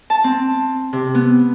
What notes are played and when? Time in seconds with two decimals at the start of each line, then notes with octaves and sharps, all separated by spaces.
0.10 A5
0.24 C4
0.93 C3
1.15 B3